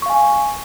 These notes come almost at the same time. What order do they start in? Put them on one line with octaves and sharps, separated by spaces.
C#6 F5 G#5